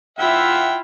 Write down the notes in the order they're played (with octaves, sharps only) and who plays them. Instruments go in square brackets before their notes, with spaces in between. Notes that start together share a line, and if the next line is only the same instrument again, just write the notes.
[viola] E4 F4 [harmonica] E5 F#5 G5